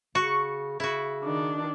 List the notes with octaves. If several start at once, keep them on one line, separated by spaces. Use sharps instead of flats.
C#3 F#4 C#6
C#3 E4 F#4
D#3 D4